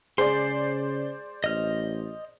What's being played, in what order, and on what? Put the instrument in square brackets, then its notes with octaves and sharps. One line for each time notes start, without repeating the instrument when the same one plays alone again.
[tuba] C#3 [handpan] G#4 [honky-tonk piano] C5 D5 [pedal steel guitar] C6
[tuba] A1 [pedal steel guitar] D#5 F6